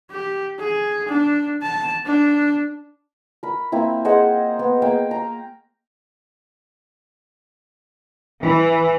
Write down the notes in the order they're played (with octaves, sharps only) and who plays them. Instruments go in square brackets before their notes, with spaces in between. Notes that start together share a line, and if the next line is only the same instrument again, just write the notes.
[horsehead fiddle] G4
G#4
D4
A5
D4
[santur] A#4 B5
A#3 C4 E4
G#4 C5 D#5 F#5
B3
A#3 F5 G5
A#5
[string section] E3